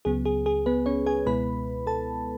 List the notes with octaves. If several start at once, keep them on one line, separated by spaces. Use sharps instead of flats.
C#2 C#3 F#3 B3 G#4
G#4
G#4
B3 B4
C#4 C#5
G#4 G#5
C#2 B2 G#3 B3 E4 B4 B5
A4 A5